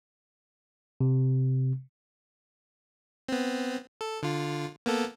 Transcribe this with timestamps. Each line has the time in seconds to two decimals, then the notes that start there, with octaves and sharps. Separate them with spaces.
1.01 C3
3.28 B3 C4
4.01 A4
4.23 D3 F4
4.86 A#3 B3 A4